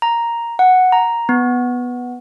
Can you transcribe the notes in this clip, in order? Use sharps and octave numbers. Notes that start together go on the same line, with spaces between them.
A#5
F#5
A#5
B3